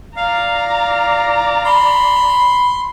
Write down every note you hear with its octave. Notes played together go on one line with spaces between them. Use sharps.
D5 F5 A#5
B5 C6